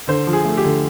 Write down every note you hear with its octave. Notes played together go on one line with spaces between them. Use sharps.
D3 C5
F3
G#4
A3
G4
D3